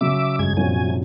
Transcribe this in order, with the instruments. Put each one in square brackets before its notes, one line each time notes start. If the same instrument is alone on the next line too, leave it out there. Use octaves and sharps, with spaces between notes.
[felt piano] C#3 F#3 [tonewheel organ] E5 D6
[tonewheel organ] G2 G#3 G#6
[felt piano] A#1 F#2 C3 [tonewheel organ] F#3 G#5